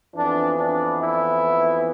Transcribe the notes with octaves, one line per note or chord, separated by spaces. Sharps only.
F2 E3 B3 D4
D4
E4